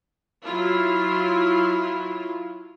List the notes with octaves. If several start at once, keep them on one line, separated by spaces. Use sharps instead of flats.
F#3 E4 F4